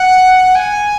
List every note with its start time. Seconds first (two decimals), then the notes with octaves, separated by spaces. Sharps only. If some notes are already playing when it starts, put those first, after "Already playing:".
Already playing: F#5
0.55 G#5